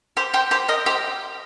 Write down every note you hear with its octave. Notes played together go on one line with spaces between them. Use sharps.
G4 C5
G4 C5
G4 C5
A#4 D#5
G4 C5